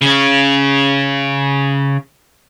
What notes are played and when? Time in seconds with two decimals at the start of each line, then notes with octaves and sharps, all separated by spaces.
0.01 C#3 C#4